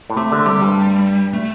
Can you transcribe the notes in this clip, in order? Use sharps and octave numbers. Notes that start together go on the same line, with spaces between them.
A2
C3 A3
D3
C3 G3
G2
A3